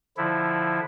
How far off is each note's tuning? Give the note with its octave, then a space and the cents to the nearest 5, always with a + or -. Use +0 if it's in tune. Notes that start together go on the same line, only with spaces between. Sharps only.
D3 +0 F3 +0 E4 +0